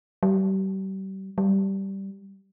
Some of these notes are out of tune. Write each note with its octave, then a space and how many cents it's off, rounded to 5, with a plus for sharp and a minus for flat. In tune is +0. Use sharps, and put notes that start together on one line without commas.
G3 -35
G3 -10